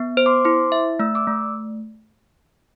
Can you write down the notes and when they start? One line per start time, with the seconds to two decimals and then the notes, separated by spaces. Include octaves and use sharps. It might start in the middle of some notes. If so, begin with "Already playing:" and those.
Already playing: B3
0.17 C5
0.26 C6 D6
0.45 E4 C6 D6
0.72 E5
0.99 A3 E6
1.15 D6 E6
1.27 A3